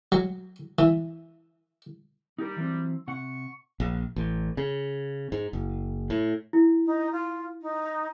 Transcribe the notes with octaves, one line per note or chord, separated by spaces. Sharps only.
F#3
E3
G3 D#4 G4 A#4
E3 F#3 C4
C3 F#5 C#6
A#1
A1
C#3
G#2
F#1
A2
E4
D#4
F4
D#4